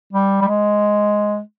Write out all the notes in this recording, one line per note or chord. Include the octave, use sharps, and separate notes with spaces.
G3
G3
G#3